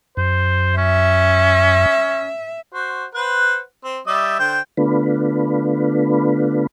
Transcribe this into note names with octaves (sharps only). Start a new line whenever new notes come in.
F#2 C5
C#4 E5
F#4 C5
B4 C5 F#5
C4
G3 D#5 E5
D3 C5 G5
D3 A3 B3 D4 F4 B4